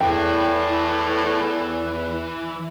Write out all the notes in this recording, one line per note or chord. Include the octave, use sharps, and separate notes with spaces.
E2 A2 E3 G5